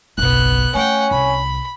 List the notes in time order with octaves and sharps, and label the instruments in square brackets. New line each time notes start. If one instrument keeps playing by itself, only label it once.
[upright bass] F#1 B1 [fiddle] B3 F#6
[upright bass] A3 [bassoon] C#4 [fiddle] F#5 G5
[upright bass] C2 [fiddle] B5